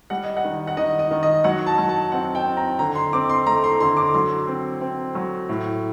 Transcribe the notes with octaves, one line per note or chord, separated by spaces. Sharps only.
G3 F#5
D#5
F#5
D#3
F#5
D#3 D#5
D#5
D#3
D#5
F#3 F#5
A5
F#3
A5
C4 F#5
G5
C4
A#5
D3 A#5
C6
C4 D6
C6
A3 A#5
C6
D3 C6
D6
F#3 C6
C4
C4
F#3
A2